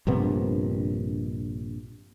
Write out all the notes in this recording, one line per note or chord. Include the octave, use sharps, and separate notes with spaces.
A#1 G2 C3 B3